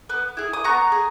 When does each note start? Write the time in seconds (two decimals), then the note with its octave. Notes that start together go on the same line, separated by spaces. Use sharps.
0.09 B3
0.37 E4 G#4
0.53 D#6
0.64 B3 A#5 C#6
0.92 G#4